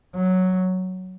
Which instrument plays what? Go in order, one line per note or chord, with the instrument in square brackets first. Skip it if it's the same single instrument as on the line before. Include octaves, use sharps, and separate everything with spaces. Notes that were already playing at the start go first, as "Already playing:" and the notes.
[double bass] F#3